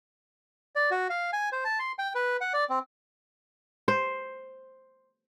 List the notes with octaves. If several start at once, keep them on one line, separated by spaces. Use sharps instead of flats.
D5
F#4
F5
G#5
C5
A5
C6
G5
B4
F#5
D5
C4
C5